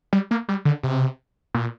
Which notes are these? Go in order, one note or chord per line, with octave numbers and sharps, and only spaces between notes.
G3
A#3
G3
D3
C3
A#2